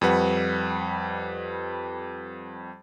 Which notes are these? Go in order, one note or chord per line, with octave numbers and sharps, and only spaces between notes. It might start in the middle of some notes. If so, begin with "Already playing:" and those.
F2 G3 B4 F#5